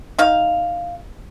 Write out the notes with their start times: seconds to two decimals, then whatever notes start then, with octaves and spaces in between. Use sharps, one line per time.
0.18 D#4 F5